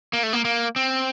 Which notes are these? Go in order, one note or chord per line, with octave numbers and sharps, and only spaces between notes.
A#3
A3
A#3
A#3
C4